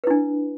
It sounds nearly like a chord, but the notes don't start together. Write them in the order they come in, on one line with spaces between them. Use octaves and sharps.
B4 E4 D4